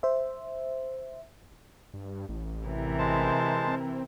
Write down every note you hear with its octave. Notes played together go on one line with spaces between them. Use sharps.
C5 E5
G2
A1
C3 E3 A#4
G#3 C5 A5
C4